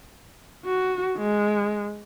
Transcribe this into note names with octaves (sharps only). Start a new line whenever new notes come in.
F#4
G#3